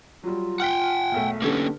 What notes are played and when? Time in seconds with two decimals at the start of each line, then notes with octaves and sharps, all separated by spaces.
0.23 F#3 G3 F4
0.60 F#5 G5 F6 F#6 B6
1.12 E1 B1 A3
1.42 D3 A#3 B3 C#4 G4 A4